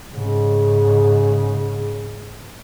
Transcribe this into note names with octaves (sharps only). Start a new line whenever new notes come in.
G#2 C#3